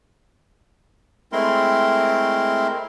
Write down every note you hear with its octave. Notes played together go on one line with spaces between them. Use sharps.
G#3 A3 C4 E4 A#4 C6